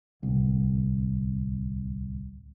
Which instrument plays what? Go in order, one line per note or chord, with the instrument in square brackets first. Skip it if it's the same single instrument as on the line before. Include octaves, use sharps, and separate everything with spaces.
[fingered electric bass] D1 C2